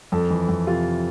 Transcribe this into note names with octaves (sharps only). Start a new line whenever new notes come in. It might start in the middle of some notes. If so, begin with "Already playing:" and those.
F2 A4
E3
F2
C3 F4